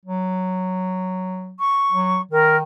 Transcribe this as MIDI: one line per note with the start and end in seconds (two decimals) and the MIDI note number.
0.06 1.57 54
1.60 2.22 85
1.92 2.21 54
2.32 2.63 51
2.32 2.57 70